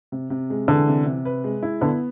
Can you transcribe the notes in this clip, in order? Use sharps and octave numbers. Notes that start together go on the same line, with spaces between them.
C3
C3
G#3
D3 E3
C3
C3
B4
G#3
E4
D3 B3